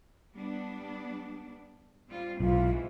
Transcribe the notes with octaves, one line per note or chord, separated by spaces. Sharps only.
G3 B3 D4
G3 C4 F4
B1 G#2 C3 E3 F4